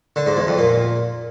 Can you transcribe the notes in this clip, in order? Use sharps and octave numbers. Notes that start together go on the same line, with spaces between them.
D3
G#2
E2
F2
A#2